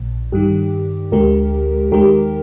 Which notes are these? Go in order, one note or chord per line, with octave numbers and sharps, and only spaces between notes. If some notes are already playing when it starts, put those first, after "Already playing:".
Already playing: A#1 A#2 F3
G2 D#3 G3 G4
D2 D3 G#3 G4 A#4
D#2 D#3 G#3 G4 A#4